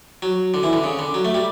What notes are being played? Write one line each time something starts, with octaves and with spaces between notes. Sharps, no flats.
F#3
D3
E3
D3
C#3
D3
F#3
A3
G3